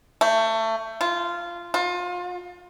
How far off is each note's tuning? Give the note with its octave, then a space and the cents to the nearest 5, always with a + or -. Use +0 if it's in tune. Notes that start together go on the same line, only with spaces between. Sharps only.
A3 +25
F4 -15
F4 +30